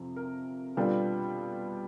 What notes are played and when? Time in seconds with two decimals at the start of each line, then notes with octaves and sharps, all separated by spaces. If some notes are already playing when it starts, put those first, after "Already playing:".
Already playing: F2 C3 F3
0.16 A#4
0.77 B2 G3 B3 D4 F4 A4